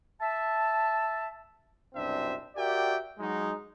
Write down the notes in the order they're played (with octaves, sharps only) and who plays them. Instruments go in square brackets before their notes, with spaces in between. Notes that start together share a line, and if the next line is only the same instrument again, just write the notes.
[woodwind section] E5 A5
[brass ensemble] C2 F#2 B2 C4 D4 E5
F#4 G4 A#4 D5 E5 G5
F#3 G#3 D#4